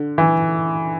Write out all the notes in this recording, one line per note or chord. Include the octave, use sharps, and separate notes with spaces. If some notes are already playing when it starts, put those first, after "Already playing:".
Already playing: D3
E3